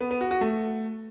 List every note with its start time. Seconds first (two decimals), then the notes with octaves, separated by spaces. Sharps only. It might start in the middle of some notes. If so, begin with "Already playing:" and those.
0.01 B3
0.11 B3
0.21 F#4
0.31 F#4
0.41 A3